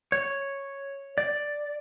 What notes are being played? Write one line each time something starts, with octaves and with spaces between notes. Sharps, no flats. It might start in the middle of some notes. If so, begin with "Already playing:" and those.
C#5
D5